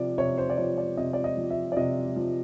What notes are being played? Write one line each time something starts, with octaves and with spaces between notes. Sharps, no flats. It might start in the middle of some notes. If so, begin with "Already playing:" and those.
Already playing: C3 F3 D5
C3 C#5
C5
D5
F3 C#5
D5
C3 D#5
D5
D#5
F3
E5
D5
C3 D#5
F3